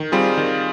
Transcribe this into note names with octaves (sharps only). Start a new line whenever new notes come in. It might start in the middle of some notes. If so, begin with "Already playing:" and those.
Already playing: D#3
G3 C4 F4 G#4
D#3